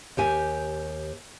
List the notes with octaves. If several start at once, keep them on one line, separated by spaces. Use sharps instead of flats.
D#2 G4 G#5